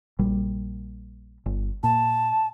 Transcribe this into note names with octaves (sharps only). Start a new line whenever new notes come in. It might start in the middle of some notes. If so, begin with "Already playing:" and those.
A#1 G3
G1
A#2 A5